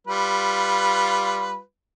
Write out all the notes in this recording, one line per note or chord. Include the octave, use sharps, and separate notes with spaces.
G3 F4 B4